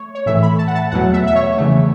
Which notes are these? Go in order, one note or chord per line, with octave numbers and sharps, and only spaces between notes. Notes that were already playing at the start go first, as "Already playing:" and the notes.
Already playing: A3 C#5
C#5
A2 E3 A3 E5
B5
A5
F#5
A5
E2 B2 F#3 A3 F#5
E5
E5
C#5
E2 C#3 A3